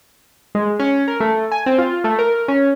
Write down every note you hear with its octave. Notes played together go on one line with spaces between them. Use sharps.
G#3
C#4
A#4
A3
G#5
C4
F4
A3
A#4
C#4